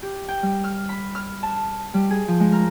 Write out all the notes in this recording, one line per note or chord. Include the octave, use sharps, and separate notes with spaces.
G4
G5
G3
F6
B5
F6
A5
G3
G#4
F3
G#3
A#4